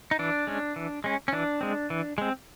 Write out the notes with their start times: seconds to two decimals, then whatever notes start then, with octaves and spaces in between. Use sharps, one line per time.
0.11 D#4
0.19 E3 D4
0.47 G#3 C#4
0.76 E3
1.04 G#3 C#4
1.28 C#4
1.32 E3 D4
1.61 G#3 C4
1.90 E3
2.18 G#3 C4